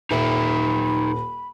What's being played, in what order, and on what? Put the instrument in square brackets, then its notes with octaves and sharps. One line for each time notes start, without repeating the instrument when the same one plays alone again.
[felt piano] D#1 [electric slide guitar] D#4 A4 E5 [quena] B5